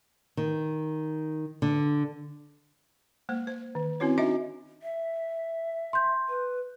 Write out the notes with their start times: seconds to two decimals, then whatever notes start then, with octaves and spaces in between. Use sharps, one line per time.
0.37 D#3
1.62 D3
3.29 G#3 A#3 C5
3.47 C5
3.75 D#3
4.00 C4 C#4 E4 F#4 C#5
4.18 D4 D#4 F#4 D#5 E5
4.82 E5
5.93 C6 G6
6.29 B4